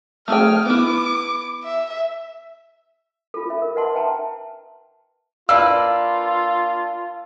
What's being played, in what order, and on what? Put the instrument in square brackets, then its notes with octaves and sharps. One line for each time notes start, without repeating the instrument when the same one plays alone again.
[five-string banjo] A3 G#4 G5 [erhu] F6
[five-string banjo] B3 E4 [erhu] D6
[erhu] E5
[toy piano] F4 A4
C#4 E5
A#4
B4 D#5 F#5 A5 C6
B4 E5 G5 A5 A#5
[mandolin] A#3 D4 B4 [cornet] F4 [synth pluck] D5 F5 [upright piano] E6